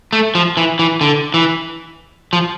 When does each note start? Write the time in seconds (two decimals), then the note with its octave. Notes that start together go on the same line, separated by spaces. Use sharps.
0.13 A3
0.35 F3
0.57 E3
0.79 E3
1.01 D3
1.34 E3
2.33 F3